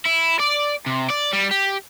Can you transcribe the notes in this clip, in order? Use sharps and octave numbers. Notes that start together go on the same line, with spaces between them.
E4
D5
C3
D5
G3
G4